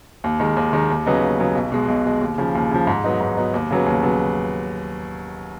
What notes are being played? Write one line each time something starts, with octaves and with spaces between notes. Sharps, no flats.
D#2
D#3 G#3
D#2
D#3 G#3
D#2
C#3 F#3 B3 D#4
D#2
C#3 F#3 B3 D#4
B1
B2 G#3
B1
B2 G#3
D#2
C#3 F3
D#2
C#3 F3
G#2
F#3 B3 D#4
G#2
F#3 B3 D#4
D#2
C#3 F#3 B3
D#2
C#3 F#3 B3